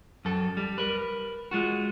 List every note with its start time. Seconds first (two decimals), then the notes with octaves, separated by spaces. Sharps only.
0.25 F#2 A4
0.57 G3
0.78 A#4 B4
1.51 G#3 F4 F#4